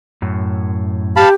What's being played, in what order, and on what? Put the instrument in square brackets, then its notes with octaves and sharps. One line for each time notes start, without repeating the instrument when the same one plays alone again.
[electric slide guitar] F#2 A2
[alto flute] G4 [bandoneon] F5 A5 B5